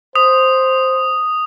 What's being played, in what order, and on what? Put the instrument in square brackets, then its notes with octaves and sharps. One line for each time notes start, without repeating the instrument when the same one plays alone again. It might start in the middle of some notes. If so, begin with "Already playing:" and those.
[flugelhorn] C5 [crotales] D#6